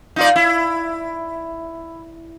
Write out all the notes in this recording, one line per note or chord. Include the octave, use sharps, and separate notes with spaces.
D#4 F4 D5
E4